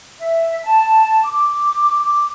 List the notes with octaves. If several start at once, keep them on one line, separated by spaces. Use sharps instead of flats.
E5
A5
D6
D6